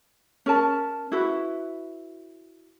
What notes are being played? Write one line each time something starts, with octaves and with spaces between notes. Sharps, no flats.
C#4 A#4 A5
E4 F#4 B4